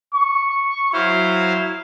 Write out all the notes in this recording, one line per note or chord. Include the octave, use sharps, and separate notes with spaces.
C#6
F#3 E4 C5 F5